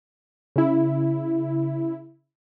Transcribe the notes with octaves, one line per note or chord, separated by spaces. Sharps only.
C#3 E4